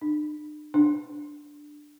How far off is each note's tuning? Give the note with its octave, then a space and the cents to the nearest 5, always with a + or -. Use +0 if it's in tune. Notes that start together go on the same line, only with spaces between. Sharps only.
D4 +45
D4 +10